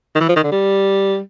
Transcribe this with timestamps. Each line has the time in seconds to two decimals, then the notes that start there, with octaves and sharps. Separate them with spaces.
0.15 D#3
0.20 E3
0.29 F3
0.36 D#3
0.44 D3
0.52 G3